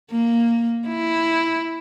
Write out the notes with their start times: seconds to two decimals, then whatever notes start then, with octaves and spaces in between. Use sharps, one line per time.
0.11 A#3
0.88 E4